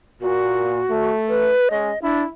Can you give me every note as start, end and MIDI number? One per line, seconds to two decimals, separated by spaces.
0.21 0.81 46
0.21 1.10 66
0.90 1.52 57
1.29 1.69 71
1.71 1.91 56
1.71 1.91 61
1.71 1.99 75
2.02 2.22 62
2.02 2.29 64